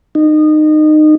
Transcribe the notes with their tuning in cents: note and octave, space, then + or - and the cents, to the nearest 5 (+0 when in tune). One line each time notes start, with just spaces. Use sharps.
D#4 -25